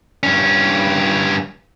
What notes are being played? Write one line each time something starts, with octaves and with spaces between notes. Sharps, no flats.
G2 C#4